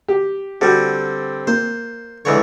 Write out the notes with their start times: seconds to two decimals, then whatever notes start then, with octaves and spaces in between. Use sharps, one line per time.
0.08 G4
0.61 D3 G3 C4 F#4
1.47 A#3 C5
2.25 C#2 D3 E3 C#5